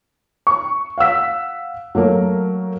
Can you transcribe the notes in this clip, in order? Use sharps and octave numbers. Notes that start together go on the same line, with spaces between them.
C#6
F5 F#5 E6 B6
F#3 A3 A#3 A#4